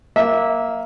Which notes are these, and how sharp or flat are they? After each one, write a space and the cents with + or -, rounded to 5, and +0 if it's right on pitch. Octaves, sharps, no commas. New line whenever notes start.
A#3 +0 E5 -20